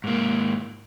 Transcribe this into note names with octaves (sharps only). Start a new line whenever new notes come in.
G#2 A#3